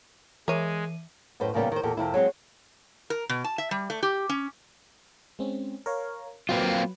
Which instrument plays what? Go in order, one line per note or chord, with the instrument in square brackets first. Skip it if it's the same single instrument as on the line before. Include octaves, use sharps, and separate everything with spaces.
[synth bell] E3 E5 D#7 [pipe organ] G#3 [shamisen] A#4 C#5
[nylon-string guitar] F#2 A2 B4 C5 G5
D#2 A#2 C#3 G3 A#3 B3
D#3 C5
E2 A#2 G4 A4
F2 C3 E4
F#3 G#3 C4
[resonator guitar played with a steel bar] A#4
B2
A5
E5
G3
A3
G4
C#4
[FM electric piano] G#3 C4 C#4
A#4 C#5 F5
[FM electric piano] F#3 B4 [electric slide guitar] A#3 C4 F4